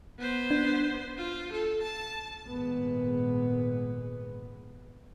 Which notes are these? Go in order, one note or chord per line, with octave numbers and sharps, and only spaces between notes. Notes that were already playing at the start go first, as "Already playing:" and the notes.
B3 C5
D4
F4
A4
A5
G#1 A#2 G#3 B3